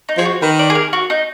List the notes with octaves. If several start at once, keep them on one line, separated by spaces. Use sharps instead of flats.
D#4
F3 G#4
F#4
D#3 B4
D5
G#4
A#4
F#4
D#4